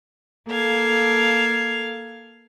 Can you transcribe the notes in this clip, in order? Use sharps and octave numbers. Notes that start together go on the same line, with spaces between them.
A#3 A4 F5 G#6